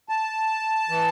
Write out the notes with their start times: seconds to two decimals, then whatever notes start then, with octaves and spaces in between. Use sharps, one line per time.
0.09 A5
0.89 E3